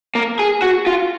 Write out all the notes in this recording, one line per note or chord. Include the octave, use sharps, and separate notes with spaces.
A#3
G#4
F#4
F4